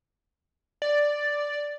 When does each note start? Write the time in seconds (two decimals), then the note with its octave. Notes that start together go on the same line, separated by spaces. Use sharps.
0.82 D5